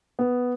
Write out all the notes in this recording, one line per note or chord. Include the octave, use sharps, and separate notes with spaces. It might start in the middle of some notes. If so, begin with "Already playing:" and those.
B3